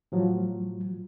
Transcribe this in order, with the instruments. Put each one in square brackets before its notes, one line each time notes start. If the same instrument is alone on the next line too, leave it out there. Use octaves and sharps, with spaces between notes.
[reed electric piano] A2 F3 F#3